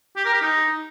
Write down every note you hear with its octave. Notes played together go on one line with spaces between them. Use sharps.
G4
A#4
G4
D#4